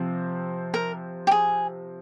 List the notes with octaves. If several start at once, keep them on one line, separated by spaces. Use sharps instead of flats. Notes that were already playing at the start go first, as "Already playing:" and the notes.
Already playing: C3 F3 C4
A#4
G4
G#4